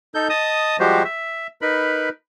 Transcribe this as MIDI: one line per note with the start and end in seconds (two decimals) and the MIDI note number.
0.15 0.28 63
0.15 0.28 69
0.15 0.28 91
0.30 0.77 75
0.30 0.77 81
0.30 0.77 87
0.80 1.03 53
0.80 1.03 55
0.80 1.03 56
0.80 1.03 66
0.80 1.03 67
0.80 1.03 72
1.05 1.47 76
1.62 2.09 63
1.62 2.09 70
1.62 2.09 71
1.62 2.09 83